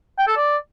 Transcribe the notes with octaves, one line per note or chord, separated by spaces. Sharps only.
G5
A4
D5